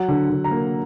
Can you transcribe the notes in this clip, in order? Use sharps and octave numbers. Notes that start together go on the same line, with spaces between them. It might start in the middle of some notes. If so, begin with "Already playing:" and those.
Already playing: F#3 F#5
D3
D3
A#5
A#3